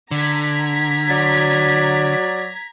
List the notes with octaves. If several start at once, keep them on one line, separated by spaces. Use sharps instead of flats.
D3 A#5 G#6 B6
F#3 D5